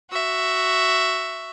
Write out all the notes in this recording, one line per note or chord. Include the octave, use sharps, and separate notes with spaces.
F#4 E5